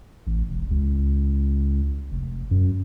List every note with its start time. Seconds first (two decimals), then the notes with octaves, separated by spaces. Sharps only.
0.27 A1
0.49 E1
0.71 C#2
2.12 F1
2.51 F#2